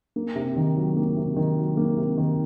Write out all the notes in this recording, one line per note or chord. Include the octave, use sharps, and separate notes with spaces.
A#3
C3
D#3
F#3
A#3
C3
D#3
F#3
A#3
C3
D#3